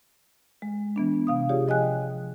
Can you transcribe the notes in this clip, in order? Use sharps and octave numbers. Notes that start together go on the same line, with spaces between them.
G#3
E3 B3 D4
C3 F5 D#6
F4 G4 G#4 C#5 D5
F3 D#5 G5 G#5 F#6